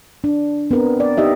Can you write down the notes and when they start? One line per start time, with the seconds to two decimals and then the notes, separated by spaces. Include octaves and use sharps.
0.24 D4
0.71 B3 C4 A#4
1.00 D5
1.17 D#4 G4 D#5 E5